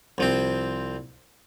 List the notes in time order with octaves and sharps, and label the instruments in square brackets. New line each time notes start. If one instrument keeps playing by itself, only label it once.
[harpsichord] C2 F3 C4